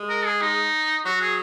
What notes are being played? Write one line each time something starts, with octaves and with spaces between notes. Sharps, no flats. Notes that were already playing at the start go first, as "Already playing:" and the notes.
Already playing: G#3
A#4
G#4
D#4
F#3 F#4
G#4